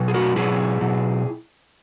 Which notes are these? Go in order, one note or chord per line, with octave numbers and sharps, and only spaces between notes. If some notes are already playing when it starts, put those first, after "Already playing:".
Already playing: B2 F#3
G#4
F#4 A#4
B2 F#3 E4 G#4
B2 F#3